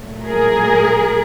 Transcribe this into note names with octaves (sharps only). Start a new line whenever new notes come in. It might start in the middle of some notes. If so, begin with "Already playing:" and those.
Already playing: A#2 F#3 A3
G#4 A#4